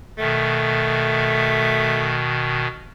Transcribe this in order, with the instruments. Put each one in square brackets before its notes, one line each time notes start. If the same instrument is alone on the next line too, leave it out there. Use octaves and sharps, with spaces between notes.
[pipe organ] B2 D#3 [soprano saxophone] A3